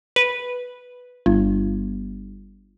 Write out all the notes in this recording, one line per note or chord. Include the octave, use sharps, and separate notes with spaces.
B4
G1